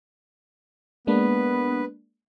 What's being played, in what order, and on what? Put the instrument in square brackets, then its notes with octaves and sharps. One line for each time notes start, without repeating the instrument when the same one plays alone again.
[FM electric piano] G#3 A#3 D4 [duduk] B3 [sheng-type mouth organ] B4